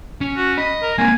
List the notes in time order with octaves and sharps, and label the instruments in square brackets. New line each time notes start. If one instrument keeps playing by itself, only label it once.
[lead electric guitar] C#4
[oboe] F#4
[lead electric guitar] D#5 [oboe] B5
[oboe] A#4
[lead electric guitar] A#3 C4 [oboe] G#5